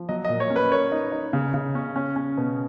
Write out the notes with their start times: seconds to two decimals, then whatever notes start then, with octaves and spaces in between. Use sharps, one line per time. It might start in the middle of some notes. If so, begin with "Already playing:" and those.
Already playing: F3
0.09 F#3 D#5
0.25 D#5
0.29 A#2
0.40 C#5
0.50 C#4
0.56 B4
0.71 A#3 C#5
0.92 D#4
1.12 D#4
1.33 C#3
1.54 C#3
1.75 C#4
1.96 C#4
2.16 C#4
2.37 B2